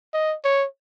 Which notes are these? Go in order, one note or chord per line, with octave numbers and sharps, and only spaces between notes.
D#5
C#5